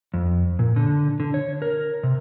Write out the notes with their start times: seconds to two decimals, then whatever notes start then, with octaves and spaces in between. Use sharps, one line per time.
0.14 F2
0.59 A#2
0.76 D3
1.20 D3
1.34 C#5
1.62 A#4
2.03 C3